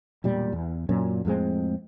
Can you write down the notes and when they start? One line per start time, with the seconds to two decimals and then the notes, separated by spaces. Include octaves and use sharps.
0.24 E1 A#2 G3
0.53 E2
0.89 F#2 A#2 F#3 C#4
1.25 F2 A2 G#3 C4